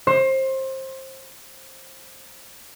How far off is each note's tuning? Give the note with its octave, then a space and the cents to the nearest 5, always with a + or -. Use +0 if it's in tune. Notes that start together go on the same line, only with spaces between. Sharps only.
C5 +25